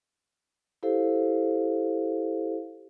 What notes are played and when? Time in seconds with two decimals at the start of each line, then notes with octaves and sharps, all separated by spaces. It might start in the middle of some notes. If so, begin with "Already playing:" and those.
0.83 E4 G4 A4 C5 F5